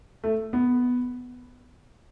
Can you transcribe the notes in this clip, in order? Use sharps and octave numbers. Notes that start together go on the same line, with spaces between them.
A3
B3